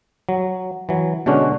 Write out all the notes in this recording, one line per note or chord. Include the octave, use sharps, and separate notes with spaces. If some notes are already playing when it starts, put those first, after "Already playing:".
F#3
E3 F#3
B2 D3 G#3 C#4 D4 F#4